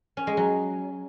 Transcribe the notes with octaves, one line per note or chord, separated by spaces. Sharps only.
C#4
G#3
F#3